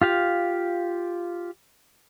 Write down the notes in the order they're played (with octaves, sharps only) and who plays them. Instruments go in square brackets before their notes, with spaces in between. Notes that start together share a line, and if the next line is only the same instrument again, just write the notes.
[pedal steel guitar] F4 G4 F5